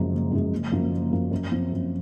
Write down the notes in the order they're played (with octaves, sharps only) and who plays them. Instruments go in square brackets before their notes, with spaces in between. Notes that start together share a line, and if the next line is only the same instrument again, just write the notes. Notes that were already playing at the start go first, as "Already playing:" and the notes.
Already playing: [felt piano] F#1 F#2 F3 G#3
F#1
F#2 F3 G#3
F#1
F#2 F3 A#3
F#1
F#2 F3 A#3
F#2
F3 C4
F#2